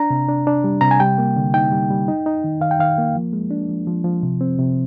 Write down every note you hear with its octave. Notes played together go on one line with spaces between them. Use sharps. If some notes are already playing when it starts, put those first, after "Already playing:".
Already playing: D4 A#5
C3
D4
D4
G3
C3 A#5
G#5
G3 G5
A#3
D3
D#4 G5
G3
G3
D#4
D#4
D#3
D#3 F5
G5
D#3 F5
A#3
F3
G#3
D4
F3
F3
F3
C3
C4
C3